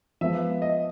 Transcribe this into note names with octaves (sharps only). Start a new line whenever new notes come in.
F3 G#3 B3 E5
D#5